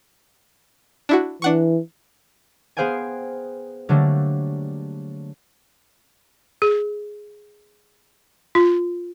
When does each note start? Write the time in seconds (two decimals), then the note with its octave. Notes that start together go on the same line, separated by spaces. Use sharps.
1.09 D4 E4 F#4
1.42 E3 D4 F#5 C#6
2.77 B3 G#4 C5 F5 G5 G#5
3.89 D3 F#3 G3 A3 A#3
6.62 G#4
8.55 F4